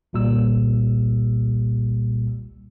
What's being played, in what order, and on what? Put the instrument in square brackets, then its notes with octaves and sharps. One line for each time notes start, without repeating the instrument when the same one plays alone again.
[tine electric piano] G1 C2 A#2 G3 E6